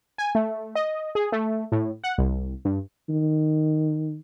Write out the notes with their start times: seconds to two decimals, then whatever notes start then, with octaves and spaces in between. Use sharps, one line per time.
0.18 G#5
0.35 A3
0.75 D#5
1.15 G#4
1.32 A3
1.72 A2
2.04 F#5
2.18 C2
2.65 G2
3.09 D#3